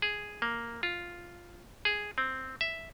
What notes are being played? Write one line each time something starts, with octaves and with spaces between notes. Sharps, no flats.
G#4
A#3
F4
G#4
C4
E5